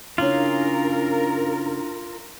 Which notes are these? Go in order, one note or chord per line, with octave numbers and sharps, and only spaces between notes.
C#3 C#4 D4 E4 F4 A#4 A#5